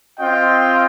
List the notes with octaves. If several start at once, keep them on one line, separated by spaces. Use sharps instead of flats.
C4 F4 D#5 G5